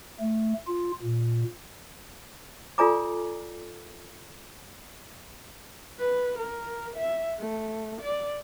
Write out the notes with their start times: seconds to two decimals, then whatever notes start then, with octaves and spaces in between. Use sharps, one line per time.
0.20 A3
0.67 F4
1.03 A#2
2.78 F4 A4 D5 G#5 A#5 D6
6.00 B4
6.39 A#4
6.97 E5
7.40 A3
8.01 D5